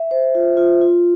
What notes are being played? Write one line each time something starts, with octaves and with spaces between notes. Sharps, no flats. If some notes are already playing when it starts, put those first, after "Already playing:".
Already playing: E5
C5
F4
F4
F4